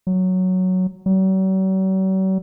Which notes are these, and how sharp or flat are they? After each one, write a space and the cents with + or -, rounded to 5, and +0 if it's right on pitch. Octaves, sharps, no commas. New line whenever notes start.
F#3 +0
F#3 +45